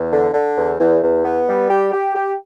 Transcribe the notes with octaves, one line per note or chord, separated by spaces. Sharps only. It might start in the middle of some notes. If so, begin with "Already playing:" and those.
Already playing: E2
D3
D3
E2
E2
E2
B3
G3
G4
G4
G4